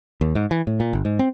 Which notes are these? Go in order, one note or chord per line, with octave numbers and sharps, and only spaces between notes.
D#2
G#2
E3
A2
A#2
G1
G#2
C4